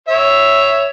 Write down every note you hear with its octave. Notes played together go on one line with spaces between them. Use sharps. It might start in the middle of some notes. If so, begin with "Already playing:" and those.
C#5 E5